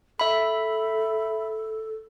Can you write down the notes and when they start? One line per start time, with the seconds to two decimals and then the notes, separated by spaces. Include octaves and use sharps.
0.20 A4 E5 B5